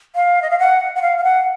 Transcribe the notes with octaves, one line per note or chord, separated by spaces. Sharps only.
F5
D#5
F5
F#5
F#5
F5
F5
F#5